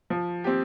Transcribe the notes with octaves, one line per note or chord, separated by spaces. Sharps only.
F3
C4 G4